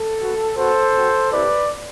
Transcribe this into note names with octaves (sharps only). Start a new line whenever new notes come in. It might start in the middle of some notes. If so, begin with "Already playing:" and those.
Already playing: A4
B3 F#4
B3 F#4 A4 C5
C4 F#4
C4 E4 G4 B4 D5